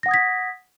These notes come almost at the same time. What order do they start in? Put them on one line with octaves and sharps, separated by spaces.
A#6 F#5 D#6 G#6 B6